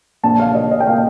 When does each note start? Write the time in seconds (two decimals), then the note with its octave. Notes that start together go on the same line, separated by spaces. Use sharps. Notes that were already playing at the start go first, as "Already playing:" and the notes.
0.23 A#1 A5
0.40 F5
0.55 A#2 D#5
0.71 D#5
0.80 G5
0.87 A#2 F5